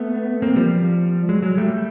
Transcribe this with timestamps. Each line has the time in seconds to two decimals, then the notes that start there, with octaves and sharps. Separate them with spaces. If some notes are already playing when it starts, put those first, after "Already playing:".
Already playing: A3 B3
0.42 A#3 C4
0.56 F3 G3
1.29 F#3 G#3
1.42 F#3 G#3
1.57 G3 A3